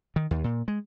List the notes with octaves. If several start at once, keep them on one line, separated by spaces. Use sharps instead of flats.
D#3
D#2
A#2
G#3